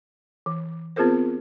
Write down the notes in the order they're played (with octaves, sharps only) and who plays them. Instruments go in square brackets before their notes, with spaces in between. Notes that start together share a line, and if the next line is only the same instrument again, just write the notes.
[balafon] E3
B3 C4 F4 G#4 A#4 C5